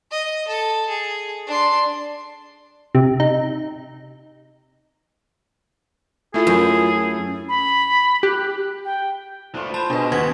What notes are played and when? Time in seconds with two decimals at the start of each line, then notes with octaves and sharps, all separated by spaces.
0.11 D#5
0.48 A4
0.89 G#4
1.47 D4 C6
2.95 C3
3.20 D#4
6.34 A3 E4 F4 G#4 A4
6.47 F#2
7.49 B5
8.23 G4 F#6
8.85 G5
9.55 F3 A3 D4 F4 B4
9.74 C5 A5 B5
9.90 B2 G#3 D4 G#4 B4
10.12 D#2 B3 C4 F#4 G#6